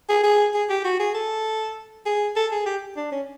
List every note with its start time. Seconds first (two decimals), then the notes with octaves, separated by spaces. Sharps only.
0.09 G#4
0.23 G#4
0.54 G#4
0.69 G4
0.85 F#4
0.99 G#4
1.14 A4
2.06 G#4
2.36 A4
2.51 G#4
2.66 G4
2.96 D4
3.12 C#4